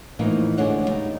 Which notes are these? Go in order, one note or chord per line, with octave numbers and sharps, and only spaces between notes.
A2 E3 F3 A#3 D#4
D2 D3 E3 G#3 C#5 F#5
G3 D#4